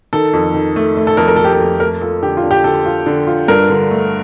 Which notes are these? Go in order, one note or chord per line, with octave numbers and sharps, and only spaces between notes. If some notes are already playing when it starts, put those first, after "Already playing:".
D#3 A4
F2
D#3
A3
A3
A4
F2 A#4
A#4
F2 A4
G4
A4
F2
A3 A#4
F4 A4
D3 G4
F4
D3
G4
D3 A4
F4
D3
F4
G2 A#4
D3
A3